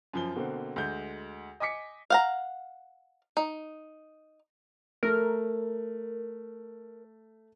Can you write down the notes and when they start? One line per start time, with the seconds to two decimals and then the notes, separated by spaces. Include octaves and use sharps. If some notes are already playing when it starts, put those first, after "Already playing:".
0.13 F#2 F3 G7
0.35 B2 D3 A#3 C4
0.76 D2 G#3 G6
1.60 D#5 G#5 D6 B6 C#7
2.10 F5 F#5 A#5
3.37 D#4
5.03 A3 A#4